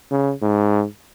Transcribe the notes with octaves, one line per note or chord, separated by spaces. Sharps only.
C#3
G#2